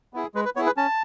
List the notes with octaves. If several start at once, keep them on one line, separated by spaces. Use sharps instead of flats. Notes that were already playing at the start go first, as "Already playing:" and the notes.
B3 E4 G#4
G#3 B4
B4
B3 E4 G#4 C#5
B4
C#4 A5